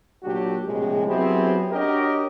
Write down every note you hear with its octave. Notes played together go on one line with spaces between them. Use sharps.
A#2 F#3 D4 F#4 G4
A#1 A2 C3 G#3
F#3 B3 C4 E4 G4 G#4
D4 F#4 G4 A#4 C#5 D#5